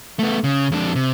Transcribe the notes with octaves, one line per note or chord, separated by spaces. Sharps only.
A3 B3
C#3
F2 D4
C3